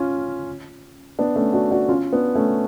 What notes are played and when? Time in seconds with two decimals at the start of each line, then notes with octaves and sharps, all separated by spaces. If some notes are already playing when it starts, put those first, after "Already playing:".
Already playing: C#4 F4
1.19 B3 D4
1.36 A3 C#4
1.53 D4 F#4
1.71 D4 F#4
1.89 C#4 F4
2.13 B3 D4
2.35 A3 C#4